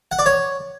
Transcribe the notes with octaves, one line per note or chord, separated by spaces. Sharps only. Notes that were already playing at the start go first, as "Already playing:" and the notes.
F#5
D5
C#5